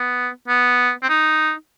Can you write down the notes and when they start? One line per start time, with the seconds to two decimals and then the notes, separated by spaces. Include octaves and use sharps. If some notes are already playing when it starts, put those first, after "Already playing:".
Already playing: B3
0.48 B3
1.03 C4
1.09 D#4